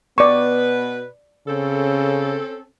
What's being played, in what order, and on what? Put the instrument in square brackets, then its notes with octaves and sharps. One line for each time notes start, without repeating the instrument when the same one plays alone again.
[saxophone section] B2 B4 [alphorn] B3 [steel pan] D5 C#6
[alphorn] C#3 [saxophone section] C4 C#4 A4